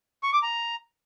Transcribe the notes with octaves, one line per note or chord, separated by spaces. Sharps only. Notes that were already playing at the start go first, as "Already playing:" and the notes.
C#6
D6
A#5